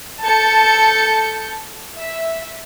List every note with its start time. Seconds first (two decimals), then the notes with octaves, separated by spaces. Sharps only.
0.22 A4 A5 G6 C#7
1.97 E5